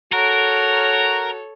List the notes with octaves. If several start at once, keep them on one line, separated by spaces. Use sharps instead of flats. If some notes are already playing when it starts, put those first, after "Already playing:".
F#4 A4 A#4 C#5